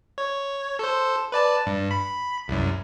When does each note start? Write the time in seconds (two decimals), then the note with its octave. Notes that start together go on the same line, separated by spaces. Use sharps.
0.18 C#5
0.79 A4 C5
1.32 B4 D5 A5
1.66 G2
1.91 B5
2.48 C2 F#2